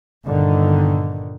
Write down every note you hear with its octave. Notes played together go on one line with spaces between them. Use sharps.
G1 A#2 D3 D#3